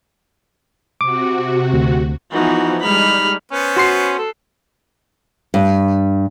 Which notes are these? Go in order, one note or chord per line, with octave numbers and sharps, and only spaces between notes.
C3 F#4 D6
D2
E3 F3 B3 D#4 F#4
G3 G#3 D#4 B5 F6
B3 C#4 B4 C5
F#4 C6 C7
A4
G2